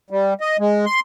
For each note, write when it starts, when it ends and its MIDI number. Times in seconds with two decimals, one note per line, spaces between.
0.10 0.34 55
0.41 0.57 75
0.59 0.85 56
0.86 1.00 84